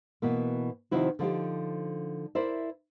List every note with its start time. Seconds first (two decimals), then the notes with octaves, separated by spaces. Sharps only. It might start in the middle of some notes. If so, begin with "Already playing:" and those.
0.22 B2 E3 A#3
0.91 C3 D#3 F3 C4 E4 F#4
1.19 D3 F3 D#4 G4
2.35 E4 A#4 C5 D5 E5